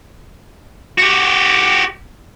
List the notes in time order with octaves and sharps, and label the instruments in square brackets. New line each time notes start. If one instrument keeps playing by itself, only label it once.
[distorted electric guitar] F#4 G4